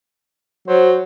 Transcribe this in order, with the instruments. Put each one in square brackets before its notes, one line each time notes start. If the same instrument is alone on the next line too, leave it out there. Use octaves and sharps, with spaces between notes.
[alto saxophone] F#3 [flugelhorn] C5